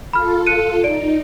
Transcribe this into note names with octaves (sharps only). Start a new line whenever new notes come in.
F4 A4 B5 F6
F#6 C#7 D#7
D#4 D5 D7